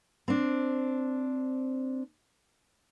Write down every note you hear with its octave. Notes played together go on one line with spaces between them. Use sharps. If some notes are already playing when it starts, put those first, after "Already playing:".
C4 D4